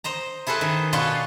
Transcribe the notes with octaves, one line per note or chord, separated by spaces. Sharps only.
C5 D#5 A#5
E4 G#4 A4 B4 C5
D#3
B2 D4 F4 B4 C#5 C6